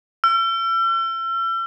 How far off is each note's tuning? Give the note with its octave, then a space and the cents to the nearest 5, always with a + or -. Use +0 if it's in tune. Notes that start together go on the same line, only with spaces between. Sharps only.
E6 +40